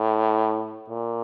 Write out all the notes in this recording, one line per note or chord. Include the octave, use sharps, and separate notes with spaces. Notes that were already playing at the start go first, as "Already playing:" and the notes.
Already playing: A2
A#2